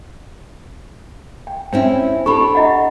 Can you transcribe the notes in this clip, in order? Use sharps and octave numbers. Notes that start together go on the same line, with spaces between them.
G5
C4 C#4 E4 G5
D4 G4 A4 B5 C#6
E4 D#5 F#5